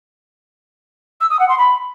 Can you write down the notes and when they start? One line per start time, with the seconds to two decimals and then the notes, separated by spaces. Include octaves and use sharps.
1.21 E6
1.30 D#6
1.40 F#5
1.49 C6
1.58 B5